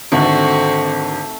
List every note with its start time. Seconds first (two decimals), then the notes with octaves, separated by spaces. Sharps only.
0.12 G#1 D3 A3 C4 F#4